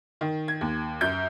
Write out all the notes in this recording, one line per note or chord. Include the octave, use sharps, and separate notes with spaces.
D#3
G#6
D#2
F#2 G6